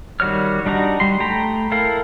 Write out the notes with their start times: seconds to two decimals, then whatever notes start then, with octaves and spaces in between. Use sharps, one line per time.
0.20 D#3 G3 F#4 C#5 F6
0.66 G3 D4 D#4 F#4 A#5
1.00 G3 C6
1.20 A3 G5 A#5 B5
1.72 E4 A4 A#4 F5